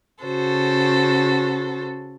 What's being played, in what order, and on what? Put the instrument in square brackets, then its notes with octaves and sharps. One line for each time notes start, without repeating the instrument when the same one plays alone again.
[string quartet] C#3 F#4 A4 C5